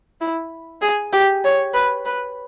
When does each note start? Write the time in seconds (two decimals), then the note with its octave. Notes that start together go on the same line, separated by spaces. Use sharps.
0.21 E4
0.81 G#4
1.13 G4
1.44 C#5
1.74 B4
2.06 B4